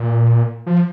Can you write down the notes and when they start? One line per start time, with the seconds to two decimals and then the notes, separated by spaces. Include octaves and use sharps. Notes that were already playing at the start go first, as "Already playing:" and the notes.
Already playing: A#2
0.66 F3